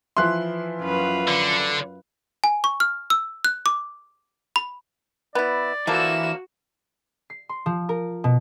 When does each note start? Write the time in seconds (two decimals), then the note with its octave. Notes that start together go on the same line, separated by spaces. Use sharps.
0.17 E3 F3 E4 C6 F#6
0.81 F#2 F4 B4
1.28 D3
2.44 G#5
2.64 C#6
2.80 F6
3.10 E6
3.45 F#6
3.66 D6
4.56 B5
5.35 B3 E4 D5
5.87 D3 E3 F3 A#3 F#4 E5 E7
7.30 C7
7.49 C6
7.66 F3
7.89 A#4
8.24 B2